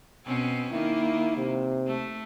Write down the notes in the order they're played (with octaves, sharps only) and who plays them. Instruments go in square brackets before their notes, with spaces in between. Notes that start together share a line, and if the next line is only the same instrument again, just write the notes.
[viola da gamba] B2 C4 C#4
[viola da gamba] D#3 A#3 [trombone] E4
[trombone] C3
[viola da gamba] A3